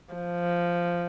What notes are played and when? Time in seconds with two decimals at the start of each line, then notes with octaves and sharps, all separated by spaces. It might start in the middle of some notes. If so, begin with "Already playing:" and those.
0.14 F3